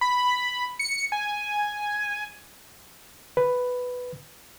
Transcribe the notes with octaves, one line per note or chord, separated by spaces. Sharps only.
B5
C#7
G#5
B4